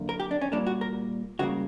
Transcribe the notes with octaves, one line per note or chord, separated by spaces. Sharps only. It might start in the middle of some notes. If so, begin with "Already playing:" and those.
Already playing: F#2 D3 A#3
A#4
G4
D4
C#4
A#2 G3 A#3 D4
F#4
A#4
C#2 C#3 E3 G3 A#3 F#4